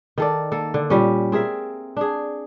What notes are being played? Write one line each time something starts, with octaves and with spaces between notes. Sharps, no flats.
D#3 A4 D5
A#3 A4
D3
A#2 G3 C#4
C4 G#4 A#4 E5
D4 G#4